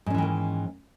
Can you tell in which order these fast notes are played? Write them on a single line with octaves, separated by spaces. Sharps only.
G#2 C#4 E3 D#3 A#3